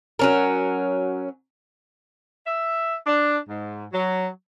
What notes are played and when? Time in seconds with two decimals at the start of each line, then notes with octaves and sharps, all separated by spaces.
0.19 F#3 C#4 A#4
2.46 E5
3.07 D4
3.49 G#2
3.93 F#3